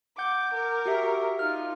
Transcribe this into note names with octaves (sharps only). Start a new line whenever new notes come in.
F#5 D6 G6
A#4
F#4 G4 E5
D#4 F4 F6